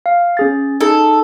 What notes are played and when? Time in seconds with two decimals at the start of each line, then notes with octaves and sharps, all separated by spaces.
0.06 F5
0.37 C#4 G#4 A6
0.81 D#4 G#4 A4